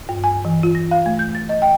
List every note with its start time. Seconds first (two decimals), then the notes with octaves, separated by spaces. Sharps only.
0.09 G2
0.24 G#5
0.45 E3
0.63 F4
0.75 A#6
0.91 F5
1.06 A3
1.19 G6
1.35 A6
1.49 D#5
1.62 G5